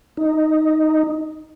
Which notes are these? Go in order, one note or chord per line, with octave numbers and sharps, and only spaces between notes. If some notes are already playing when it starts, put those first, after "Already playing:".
D#4